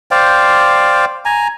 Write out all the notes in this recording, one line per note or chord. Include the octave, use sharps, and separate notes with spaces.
C5 D5 F5 G5
G#5 A#5